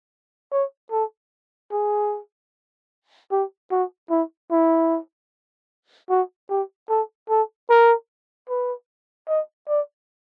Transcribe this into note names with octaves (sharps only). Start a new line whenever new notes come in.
C#5
A4
G#4
G4
F#4
E4
E4
F#4
G4
A4
A4
A#4
B4
D#5
D5